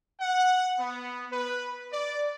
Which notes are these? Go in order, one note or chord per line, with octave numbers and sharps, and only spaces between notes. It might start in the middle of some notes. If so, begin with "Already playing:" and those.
F#5
B3
B4
D5